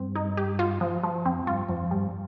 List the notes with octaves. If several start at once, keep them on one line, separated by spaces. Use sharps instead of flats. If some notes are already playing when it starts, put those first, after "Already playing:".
Already playing: G2 C4
D#4
G4
F4
F3
F3
F2 C4
G2 F4
F2 F3
G2 G3